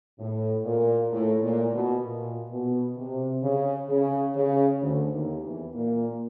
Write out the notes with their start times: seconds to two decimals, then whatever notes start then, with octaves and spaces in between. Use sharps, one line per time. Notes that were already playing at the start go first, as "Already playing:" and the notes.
0.18 A2
0.65 A#2
1.11 A2
1.42 A#2
1.73 B2
2.03 A#2
2.50 B2
2.97 C3
3.42 C#3
3.88 C#3
4.35 C#3
4.81 D2 D3
5.11 D#2 D#3
5.43 E2 E3
5.73 A#2 A#3